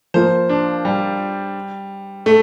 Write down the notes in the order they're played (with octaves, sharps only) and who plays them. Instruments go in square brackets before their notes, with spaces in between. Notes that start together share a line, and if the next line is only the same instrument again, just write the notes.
[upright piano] F3 A#3 F4 [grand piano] C5
[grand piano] D4
G3
A3